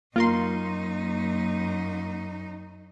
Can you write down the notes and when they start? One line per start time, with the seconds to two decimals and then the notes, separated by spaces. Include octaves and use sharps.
0.16 F#2 A#3 D#4 F4 A#4 C6